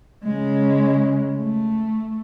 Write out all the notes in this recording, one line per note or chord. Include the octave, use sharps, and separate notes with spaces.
C#3 G#3
A3